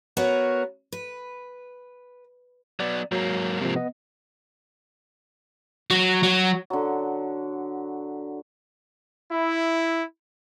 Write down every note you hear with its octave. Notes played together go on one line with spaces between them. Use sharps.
B3 F#4 A#4 B4 C#5
B4
F#3 B3 D5
G#2 F#3 A#3
C3 F3
B3 D#5
F#3
F#3
D3 F#3
E4